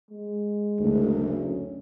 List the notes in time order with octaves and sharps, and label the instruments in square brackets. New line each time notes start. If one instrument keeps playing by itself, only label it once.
[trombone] G#3
[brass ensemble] F#1 D2
[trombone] C#4